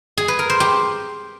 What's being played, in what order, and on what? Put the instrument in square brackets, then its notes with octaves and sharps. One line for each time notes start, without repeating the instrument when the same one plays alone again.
[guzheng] G#4
B4
A#4
C5
G4